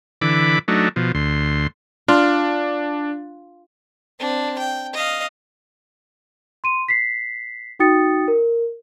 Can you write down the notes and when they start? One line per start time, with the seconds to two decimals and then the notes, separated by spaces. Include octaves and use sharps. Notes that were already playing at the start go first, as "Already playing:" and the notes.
0.21 D3 E3 B5 D6
0.68 F#3 A3 D4 D#4
0.96 B2 F3
1.15 D2 C6
2.08 D4 F4
4.20 C4 D4
4.58 G5
4.94 D#5 F5
6.64 C6 D#7
6.88 B6 C7
7.79 D#4 F#4 G5 D#6 A6 C#7
8.28 A#4